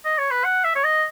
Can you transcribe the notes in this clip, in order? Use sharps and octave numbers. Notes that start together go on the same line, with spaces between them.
D#5
C#5
B4
F#5
E5
C#5
D#5